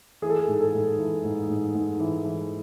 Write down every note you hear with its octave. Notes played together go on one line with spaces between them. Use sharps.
E3 G#4
A4
G#4
G#2
A4
G#2
E3
G#2
G#2
G#2
E3
E3